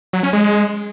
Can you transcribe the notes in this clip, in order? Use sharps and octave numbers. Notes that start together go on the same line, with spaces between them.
F#3
C#4
G#3